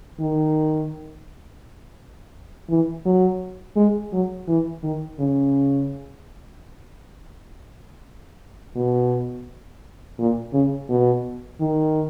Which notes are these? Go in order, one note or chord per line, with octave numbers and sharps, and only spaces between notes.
D#3
E3
F#3
G#3
F#3
E3
D#3
C#3
B2
A#2
C#3
B2
D#3